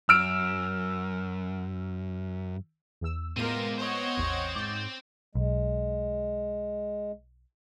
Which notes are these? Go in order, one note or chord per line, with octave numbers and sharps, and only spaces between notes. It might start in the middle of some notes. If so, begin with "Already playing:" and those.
F#2 E6 F6 D7
E2 E6
A2 G#3 B3 C4 F4 G4 A#4 D#7
C4 C5 C#5 D#5 F#5
A1 E2
G#2 D6 G6 A6
B1 G#3